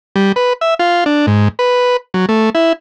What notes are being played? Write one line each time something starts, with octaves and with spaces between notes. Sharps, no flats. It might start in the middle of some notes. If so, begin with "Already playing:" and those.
G3
B4
E5
F4
D4
G#2
B4
F#3
A3
E4